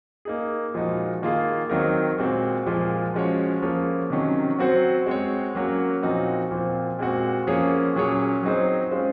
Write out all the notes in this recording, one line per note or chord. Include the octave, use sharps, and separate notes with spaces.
A#3 D#4 G#4
A#2 F3 G#3 D#4 F#4
D#3 A#3 F4 G#4
D#3 F#3 C4 D#4 A#4
A#2 G#3 C4 F#4
A#2 F3 G#3
F3 G#3 C#4 F#4 C#5
F3 A#3 C#4 G#4 C#5
C3 D#3 F#3 C#4
F#3 C4 F#4 C5
G#3 C4 F#4 C#5
F#3 A#3 C#4 F#4 C#5
A#2 F3 C4 D#4 F#4
A#2 F3 C4
A#2 G#3 C4 F#4
F3 A#3 C#4 G#4 C#5
A#2 F#3 C#4 G#4 C#5
F#3 C4 D#4 G#4 C5
G#3 C#4 F4 C5